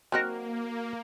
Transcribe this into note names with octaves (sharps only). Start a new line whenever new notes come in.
F#3 A#3 C4 D#4 F#4 A#4